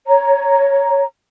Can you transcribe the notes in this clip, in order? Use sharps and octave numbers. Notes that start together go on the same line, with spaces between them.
C#5 A#5